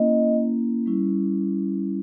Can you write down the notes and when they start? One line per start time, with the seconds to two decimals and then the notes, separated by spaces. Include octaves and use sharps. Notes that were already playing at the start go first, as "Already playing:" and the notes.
Already playing: A#3 C#4 E4 D#5
0.86 G3 C#4 E4